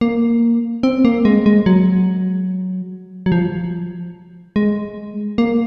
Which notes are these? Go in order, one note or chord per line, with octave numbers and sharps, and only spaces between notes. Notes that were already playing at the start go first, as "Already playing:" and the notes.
A#3
C4
A#3
G#3
G#3
F#3
F#3
F3
G#3
A#3